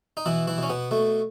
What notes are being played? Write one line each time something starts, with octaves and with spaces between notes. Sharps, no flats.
D#4
B2 E3 E4
E3 E4
B2
C#4
B2 B3
B2 A3